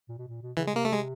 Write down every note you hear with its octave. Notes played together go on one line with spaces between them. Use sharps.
A#2
B2
A#2
B2
C#3 E3
G#3
C3 A#3
A3
G#3